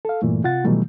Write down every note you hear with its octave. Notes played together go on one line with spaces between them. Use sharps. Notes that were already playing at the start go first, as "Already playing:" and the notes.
A4 F5
G2 A#2 E3 A3
C3 F4 F#5 A6
B2 D#3 E3 F#3 G3 A3